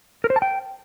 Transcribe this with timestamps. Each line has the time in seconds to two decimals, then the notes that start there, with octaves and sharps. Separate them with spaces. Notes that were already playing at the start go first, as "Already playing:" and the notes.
0.24 A#4
0.30 C5
0.36 A5
0.42 G5